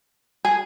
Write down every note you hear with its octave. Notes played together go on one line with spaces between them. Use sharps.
G#4